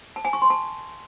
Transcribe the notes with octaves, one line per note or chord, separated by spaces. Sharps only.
A5
G#5
C#6
C6
A5